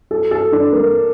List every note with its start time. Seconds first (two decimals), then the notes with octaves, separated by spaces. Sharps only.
0.11 A4
0.31 A4
0.53 D4
0.72 A#3